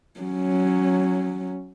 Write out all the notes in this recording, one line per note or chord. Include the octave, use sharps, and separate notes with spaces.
F#3 C#4